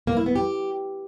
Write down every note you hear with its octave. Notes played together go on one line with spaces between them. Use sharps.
A#3
E4
B3
G4